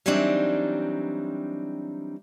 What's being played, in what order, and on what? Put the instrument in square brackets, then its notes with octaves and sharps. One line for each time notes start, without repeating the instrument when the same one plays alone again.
[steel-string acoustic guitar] E3 F#3 G3 C4 D4 D#4